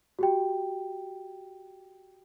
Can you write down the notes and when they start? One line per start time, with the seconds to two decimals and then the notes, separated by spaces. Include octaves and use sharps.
0.19 F#4 G4 G5